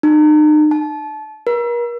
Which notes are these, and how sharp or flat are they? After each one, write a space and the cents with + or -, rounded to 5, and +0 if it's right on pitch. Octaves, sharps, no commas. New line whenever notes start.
D#4 -40
A5 -25
A#4 +40